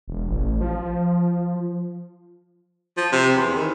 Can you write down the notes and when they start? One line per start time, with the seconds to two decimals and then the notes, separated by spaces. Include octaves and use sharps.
0.07 E1
0.28 A1
0.61 F3
2.97 F3
3.12 C3
3.36 E2
3.56 D#3